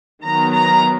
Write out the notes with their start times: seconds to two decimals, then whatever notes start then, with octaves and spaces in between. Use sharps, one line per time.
0.24 D#3 F#3 B3 A#5
0.54 A#5